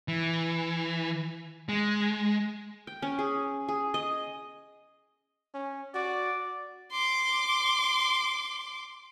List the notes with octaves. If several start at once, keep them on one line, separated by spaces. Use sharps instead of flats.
E3
G#3
G5
C#4
G#4
G#4
D#5
C#4
F#4 D5
C6 D6